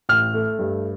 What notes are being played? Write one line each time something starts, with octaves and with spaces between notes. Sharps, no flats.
A1 F6
A3
G2